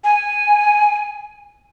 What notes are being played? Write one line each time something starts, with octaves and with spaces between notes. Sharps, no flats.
G#5